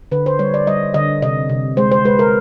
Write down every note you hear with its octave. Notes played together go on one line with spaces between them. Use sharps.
D3 B4
C5
G3 C#5
D5
G3 D#5
D3 D#5
C3 D#5
C3
G#3 C5
C5
G#3 B4
A#4